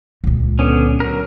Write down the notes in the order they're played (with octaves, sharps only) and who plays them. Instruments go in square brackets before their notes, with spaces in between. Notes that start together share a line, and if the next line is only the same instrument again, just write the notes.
[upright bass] C#2 A#2
[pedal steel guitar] D3 B3 C#4
F#3 A#4